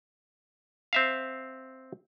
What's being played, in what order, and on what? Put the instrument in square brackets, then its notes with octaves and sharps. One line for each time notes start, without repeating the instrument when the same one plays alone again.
[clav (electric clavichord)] C4 E5 F5